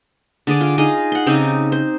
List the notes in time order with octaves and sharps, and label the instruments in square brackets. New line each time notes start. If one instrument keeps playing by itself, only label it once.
[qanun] D3 G#4 D5
F4
D#4 F4 G#4 D#5
F#5 C6
C#3 C4 D#4 G4
C5